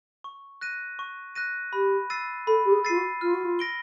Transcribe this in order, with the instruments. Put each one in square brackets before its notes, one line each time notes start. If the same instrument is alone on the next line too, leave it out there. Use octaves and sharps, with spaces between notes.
[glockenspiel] C#6
F#6 A#6 D#7
C#6
F#6 A#6 D#7
[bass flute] G4 [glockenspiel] B5
[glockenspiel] E6 A6 C7 D#7
[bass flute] A4 [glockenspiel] B5
[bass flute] G4
G#4
[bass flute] F4 [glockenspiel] E6 A6 C7 D#7
[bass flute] F#4
[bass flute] F4 [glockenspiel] F6
[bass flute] F#4
F4
[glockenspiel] A#6 D7 G7